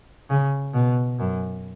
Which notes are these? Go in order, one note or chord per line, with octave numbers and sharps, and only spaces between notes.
C#3
B2
F#2